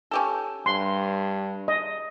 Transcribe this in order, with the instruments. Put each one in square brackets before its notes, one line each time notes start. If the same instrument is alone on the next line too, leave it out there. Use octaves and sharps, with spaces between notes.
[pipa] C#4 G4 A4
[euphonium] G2 [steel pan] C6
[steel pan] D#5